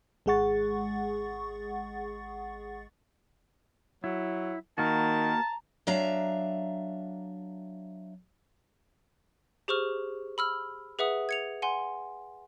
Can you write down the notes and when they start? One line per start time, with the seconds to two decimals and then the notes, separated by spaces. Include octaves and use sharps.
0.26 G#1 G#3 G#4 F#5 C#6 A6
4.04 F#3 E4
4.78 D#3 A#3 F#4 A5 A#5
5.87 F#3 D4 E5 F5 A#5
9.68 G4 G#4 C5 C#6 F6
10.38 B5 E6 F6
10.99 G#4 B4 E5 F#5 D#6
11.29 G#6 C#7 F7
11.62 F#5 G#5 C6